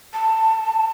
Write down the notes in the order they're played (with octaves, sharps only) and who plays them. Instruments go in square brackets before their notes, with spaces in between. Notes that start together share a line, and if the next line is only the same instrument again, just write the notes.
[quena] A5